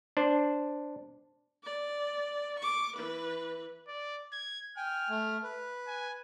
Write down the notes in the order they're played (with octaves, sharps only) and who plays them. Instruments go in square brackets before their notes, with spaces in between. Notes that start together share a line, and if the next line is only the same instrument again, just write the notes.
[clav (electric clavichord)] D4 C5
[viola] D5
C#6 D6
E3 B4
[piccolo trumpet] D5
G#6
[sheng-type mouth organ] G5 G#5 [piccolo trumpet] F6
[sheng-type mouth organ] A3
B4
[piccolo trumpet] G#5